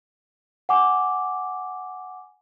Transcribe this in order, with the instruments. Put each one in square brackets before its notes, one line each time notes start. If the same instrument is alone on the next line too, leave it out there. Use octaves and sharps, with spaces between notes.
[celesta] F#5 G#5 D6